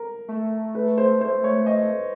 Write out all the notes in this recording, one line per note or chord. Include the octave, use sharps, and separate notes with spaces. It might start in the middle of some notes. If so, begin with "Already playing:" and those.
Already playing: A#4
A3
B4
C5
C5
C#5
D#5